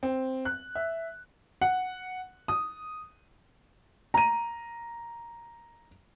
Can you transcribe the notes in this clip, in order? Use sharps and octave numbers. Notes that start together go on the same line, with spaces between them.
C4
F#6
E5
F#5
D#6
A#5 D#7